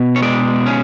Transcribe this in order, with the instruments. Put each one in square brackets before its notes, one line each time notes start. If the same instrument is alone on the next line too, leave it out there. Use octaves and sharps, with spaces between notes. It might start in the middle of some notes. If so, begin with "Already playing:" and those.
Already playing: [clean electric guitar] B2
C#5
G#3 D5
C#4